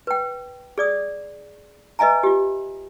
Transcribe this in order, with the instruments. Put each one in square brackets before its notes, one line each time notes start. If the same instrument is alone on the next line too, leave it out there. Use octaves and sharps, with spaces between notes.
[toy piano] B4 G5
G#4 D5 D#6
B4 D#5 E5 G#5 A#5
F4 G4